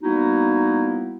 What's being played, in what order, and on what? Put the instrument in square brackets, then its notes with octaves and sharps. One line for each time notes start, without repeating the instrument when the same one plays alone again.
[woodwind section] G3 A#3 B3 D#4 E4 F#4